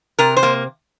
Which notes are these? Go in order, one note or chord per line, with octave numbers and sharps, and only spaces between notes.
C3 A#4
C5
A#3